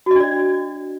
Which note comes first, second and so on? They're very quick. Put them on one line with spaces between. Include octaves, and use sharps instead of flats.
F#4 D#5 D4 D5